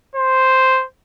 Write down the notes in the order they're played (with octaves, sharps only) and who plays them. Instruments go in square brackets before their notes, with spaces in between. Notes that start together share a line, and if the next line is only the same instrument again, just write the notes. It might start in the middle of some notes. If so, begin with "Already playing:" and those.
[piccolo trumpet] C5